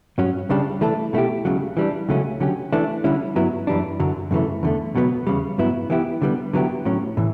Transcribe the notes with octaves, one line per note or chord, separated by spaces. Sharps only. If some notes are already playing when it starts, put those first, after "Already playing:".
G2 F#3 C#4
C#2 C#3 G3 D4 G4
E3 A3 D4 A4
B2 A3 E4 G4
C#2 C#3 F#3
E3 G3 D4
C#2 C#3 F#3 A3 C#4
D3 F#3 C#4 G4
E3 A3 D4
D3 G3 C#4 E4
G2 F#3 B3 E4
F#2 E3 G3 D4
F#2 D3 F#3
F#2 C#3 E3 A3
E2 D3 A3
C#2 B2 F#3 B3
E2 C#3 G3
G2 F#3 B3 E4
E3 B3 E4 G4
D3 G3 B3
D3 F#3 B3 E4 G4
A2 F#3 C#4
A2 E3